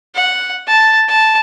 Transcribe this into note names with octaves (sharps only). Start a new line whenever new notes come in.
F#5
A5
A5